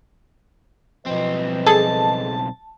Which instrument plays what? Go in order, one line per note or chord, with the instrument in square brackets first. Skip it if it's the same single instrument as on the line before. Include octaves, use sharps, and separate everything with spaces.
[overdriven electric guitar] B1 C4 [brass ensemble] F3 B4 D#5
[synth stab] G#4 A4 [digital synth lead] A5